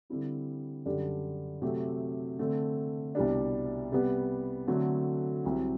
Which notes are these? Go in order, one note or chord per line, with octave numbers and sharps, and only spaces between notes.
D3 G3 C4 E4 G4
F#2 D3 G3 D4 G4
C3 F#3 A3 C4 G4
D3 A3 C4
C2 B2 G3 D4
C3 G3 B3
D3 F#3 A3 C4
C2 C3 F#3 C4